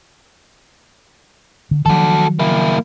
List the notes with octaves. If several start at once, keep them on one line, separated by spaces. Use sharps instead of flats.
D3
D#3 F3 F#3 F#4 A4
A#3 E4